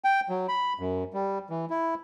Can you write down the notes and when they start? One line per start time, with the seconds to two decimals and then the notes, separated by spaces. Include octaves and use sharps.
0.04 G5
0.29 F#3
0.48 B5
0.79 F#2
1.13 G3
1.50 E3
1.70 E4